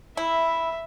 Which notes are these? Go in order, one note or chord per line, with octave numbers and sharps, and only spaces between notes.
E4 E5